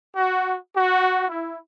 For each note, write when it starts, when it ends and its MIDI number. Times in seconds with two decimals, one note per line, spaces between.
0.16 0.54 66
0.74 1.28 66
1.28 1.57 64